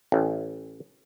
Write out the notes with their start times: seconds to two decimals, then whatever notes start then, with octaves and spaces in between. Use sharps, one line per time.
0.12 A1